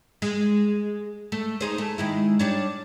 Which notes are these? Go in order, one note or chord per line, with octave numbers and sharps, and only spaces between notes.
G#3
A3
D#4 G#4 C5
A3
D#3 G#3 E4
G3 D4 C#5